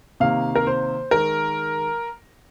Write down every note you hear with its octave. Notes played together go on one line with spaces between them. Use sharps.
C3 D#3 A#3 F5
A#4
C5
D#3 G#3 A#4